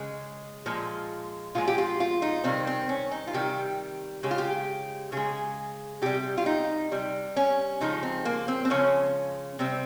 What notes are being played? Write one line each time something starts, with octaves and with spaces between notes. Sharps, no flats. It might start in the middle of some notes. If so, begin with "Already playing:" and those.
Already playing: C#3 G#3
A#2 F3 G#3
A#2 F3 G#3 F4
G4
F4
F4
D#4
C3 D#3 G3 C4
C4
C#4
D#4
F4
C3 D#3 G3 G4
C#3 G#3 G4
F4
G4
C#3 G#3 G#4
C3 G3 G4
F4
D#4
C3 G3
C#4
C#3 F3 G#3 D#4
C4
A#3
C4
C4
C#3 F3 G#3 C#4
C3 G3 C4